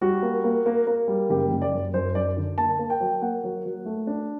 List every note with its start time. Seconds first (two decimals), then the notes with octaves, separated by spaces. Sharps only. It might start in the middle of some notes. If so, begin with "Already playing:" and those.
0.01 G3 F#4
0.22 A#3
0.44 A#3
0.66 A#3
0.87 A#3
1.08 G3
1.30 F#1 G4
1.51 F#1
1.62 D5
1.73 F#2
1.94 F#2 C5
2.15 F#2 D5
2.37 D3
2.58 A#3 A5
2.79 A#3
2.90 G5
3.00 F#3
3.22 A#3 F#5
3.43 F#3
3.65 F#3
3.86 A3
4.07 D4